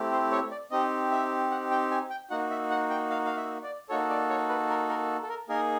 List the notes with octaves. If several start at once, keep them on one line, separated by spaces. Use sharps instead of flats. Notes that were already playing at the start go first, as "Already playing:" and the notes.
Already playing: A3 C4 E4 G4
C5
C#5
D5
C4 D#4 G4 D#5
E5
F#5
G5
G#5
G5
A#3 D#4 F#4 F#5
E5
F#5
G5
F5
F5
E5
D5
A#3 D#4 F#4 A4 C#5
D5
C#5
B4
A#4
A#4
A4
A#4
A#3 D#4 G#4 A#4